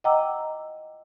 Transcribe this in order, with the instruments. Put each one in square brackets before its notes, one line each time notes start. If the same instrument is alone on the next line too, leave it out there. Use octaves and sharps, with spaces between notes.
[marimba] D#5 F#5 G5 A#5 D6 E6